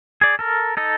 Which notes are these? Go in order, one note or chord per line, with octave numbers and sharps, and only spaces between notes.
G#4 D5
A4 A#4
D#4 A4 D#5